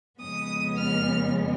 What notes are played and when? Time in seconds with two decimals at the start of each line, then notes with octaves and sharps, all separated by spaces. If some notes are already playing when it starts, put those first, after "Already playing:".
0.20 F2 C#3 G#3 B3 D#6
0.76 F6